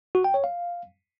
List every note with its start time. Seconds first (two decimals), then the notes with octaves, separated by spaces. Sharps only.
0.15 F#4
0.24 G5
0.34 C#5
0.44 F5